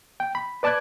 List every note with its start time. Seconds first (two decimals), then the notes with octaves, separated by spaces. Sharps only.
0.20 G5
0.35 B5
0.63 B4 D5 A5 D6 F#6 G#6